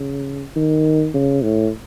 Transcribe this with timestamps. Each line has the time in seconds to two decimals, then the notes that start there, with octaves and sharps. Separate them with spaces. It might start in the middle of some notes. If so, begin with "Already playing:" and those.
Already playing: C#3
0.56 D#3
1.14 C#3
1.43 A2